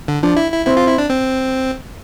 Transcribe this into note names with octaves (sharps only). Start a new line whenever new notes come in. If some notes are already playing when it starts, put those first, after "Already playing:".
D3
F3 D4
E4
E4
C4 E4
F4
E4
D4
C4